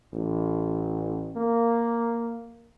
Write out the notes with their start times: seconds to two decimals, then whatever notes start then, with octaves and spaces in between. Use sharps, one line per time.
0.13 A1
1.36 A#3